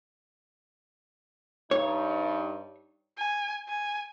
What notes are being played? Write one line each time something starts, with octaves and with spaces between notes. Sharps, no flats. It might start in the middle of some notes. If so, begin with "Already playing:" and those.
G2 D#4 C#5
G#5
G#5